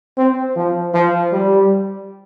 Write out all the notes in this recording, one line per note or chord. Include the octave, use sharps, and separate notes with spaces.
C4
F3
F3
G3